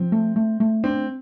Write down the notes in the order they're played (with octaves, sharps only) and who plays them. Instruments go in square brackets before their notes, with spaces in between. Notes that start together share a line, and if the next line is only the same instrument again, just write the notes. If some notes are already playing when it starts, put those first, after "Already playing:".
Already playing: [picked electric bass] F3 [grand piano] C4
[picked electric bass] A3
A3
A3
[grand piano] C4 [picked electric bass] D4